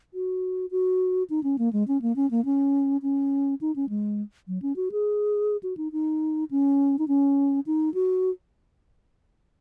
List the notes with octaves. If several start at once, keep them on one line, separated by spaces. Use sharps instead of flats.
F#4
F#4
D#4
C#4
A#3
G#3
C#4
A#3
C#4
A#3
C#4
C#4
D#4
C#4
G#3
F#3
C#4
F#4
G#4
F#4
D#4
D#4
C#4
D#4
C#4
D#4
F#4